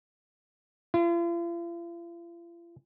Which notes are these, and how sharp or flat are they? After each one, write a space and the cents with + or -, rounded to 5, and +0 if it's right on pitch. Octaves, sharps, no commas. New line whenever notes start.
F4 -45